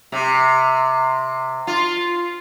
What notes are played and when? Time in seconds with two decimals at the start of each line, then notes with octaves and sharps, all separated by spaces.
0.12 C3
1.67 F4